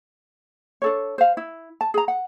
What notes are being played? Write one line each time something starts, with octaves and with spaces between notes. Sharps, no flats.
D4 A4 C#5
C5 F5
E4
A5
G#4 A#5
F#5